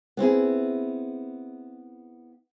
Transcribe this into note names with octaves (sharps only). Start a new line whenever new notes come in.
B3 C4 E4 G#4